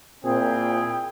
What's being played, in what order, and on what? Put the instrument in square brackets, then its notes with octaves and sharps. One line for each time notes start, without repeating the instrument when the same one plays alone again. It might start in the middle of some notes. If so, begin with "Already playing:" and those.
[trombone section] A#2 C4 [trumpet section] E4 G#4 G5